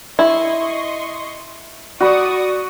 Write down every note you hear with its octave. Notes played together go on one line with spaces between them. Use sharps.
E4 D#5 C6 C#6
F#4 D5 B5 C#6 D#6